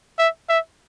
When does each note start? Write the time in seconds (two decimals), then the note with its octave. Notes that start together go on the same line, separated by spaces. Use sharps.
0.19 E5
0.49 E5